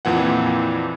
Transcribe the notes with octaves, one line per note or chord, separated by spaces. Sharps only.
F2 A#2 E3 F#5